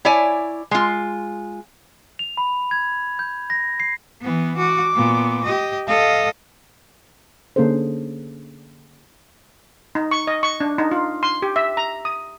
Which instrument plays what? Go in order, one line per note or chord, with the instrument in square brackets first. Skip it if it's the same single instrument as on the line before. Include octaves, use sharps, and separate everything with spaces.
[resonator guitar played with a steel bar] E4 C#5 D5 G#5
G#3 F4
[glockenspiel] F7
B5
G#6
G6
A#6
C7
[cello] E3 B3
[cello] F#4 [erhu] D6
[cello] A#2 B3
G4 D#5
[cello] A4 D#5 [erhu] F5
[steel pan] D3 A#3 C#4 G#4 A4 C5
D#4
C#6
D#5
C#6
D4
D#4
F4
C6
G4
E5
A#5
D#6